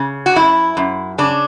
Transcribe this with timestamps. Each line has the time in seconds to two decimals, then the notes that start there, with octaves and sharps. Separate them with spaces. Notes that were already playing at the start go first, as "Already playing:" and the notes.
Already playing: C#3
0.26 F#4
0.36 F#2 E4
0.77 F#2
1.18 C#3 D4